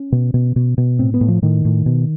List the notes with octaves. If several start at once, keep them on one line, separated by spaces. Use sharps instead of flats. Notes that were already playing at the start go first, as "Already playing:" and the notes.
Already playing: C#4
B2
B2
B2
B2
A2 C4
B3
A2
F3
A2 D#3
A2
B2